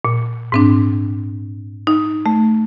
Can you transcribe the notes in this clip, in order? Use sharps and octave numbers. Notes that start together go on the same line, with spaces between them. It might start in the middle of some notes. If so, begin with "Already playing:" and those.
A#2
G#2 C4 D4
D#4
A3